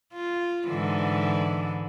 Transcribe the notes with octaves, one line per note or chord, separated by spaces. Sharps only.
F4
G#2 D3 E3